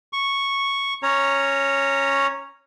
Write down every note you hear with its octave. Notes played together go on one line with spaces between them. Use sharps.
C#6
C#4 C#5 A#5